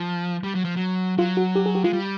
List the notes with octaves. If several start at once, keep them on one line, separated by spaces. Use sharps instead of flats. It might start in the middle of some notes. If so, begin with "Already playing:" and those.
Already playing: F3
G3
F#3
F3
F#3
F#3 F4
F#4
G4
G#4
G4
G#3 F4
G3